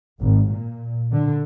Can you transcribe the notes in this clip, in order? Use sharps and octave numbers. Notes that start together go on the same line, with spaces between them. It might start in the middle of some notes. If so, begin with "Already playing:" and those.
G#1
A#2
D3